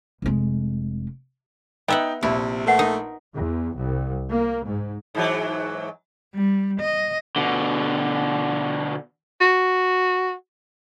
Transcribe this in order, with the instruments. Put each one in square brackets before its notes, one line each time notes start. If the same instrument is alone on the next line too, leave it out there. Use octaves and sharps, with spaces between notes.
[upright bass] F1 G#3
[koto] B3 E5 F#5 [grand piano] D#4 G5
[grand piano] A#1 [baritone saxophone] C3 [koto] E4
[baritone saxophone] A3 [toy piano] A#4 B4 F#5
[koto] D#4 [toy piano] A#4
[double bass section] E2
C2
A#3
G#2
[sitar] G#2 E3 F#3
[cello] G3
D#5
[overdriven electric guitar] B2 D3
[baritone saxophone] F#4